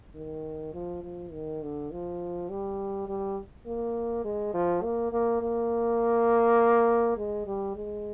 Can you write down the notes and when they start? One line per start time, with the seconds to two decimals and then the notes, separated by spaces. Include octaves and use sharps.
0.15 D#3
0.74 F3
1.03 F3
1.32 D#3
1.62 D3
1.91 F3
2.50 G3
3.08 G3
3.66 A#3
4.24 G#3
4.54 F3
4.83 A#3
5.12 A#3
5.42 A#3
7.17 G#3
7.46 G3
7.76 G#3